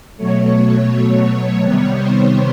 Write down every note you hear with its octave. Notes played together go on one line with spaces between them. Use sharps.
B2 F#3 A3 C#5
C#5
C3 D#3 G3 B3 C#5
C5